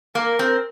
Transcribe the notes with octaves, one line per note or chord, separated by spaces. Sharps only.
A#3 A#4
C4